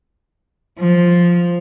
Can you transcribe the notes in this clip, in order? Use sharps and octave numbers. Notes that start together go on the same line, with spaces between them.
F3